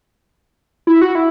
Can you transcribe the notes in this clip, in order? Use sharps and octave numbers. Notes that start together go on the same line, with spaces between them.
E4
F#4
E4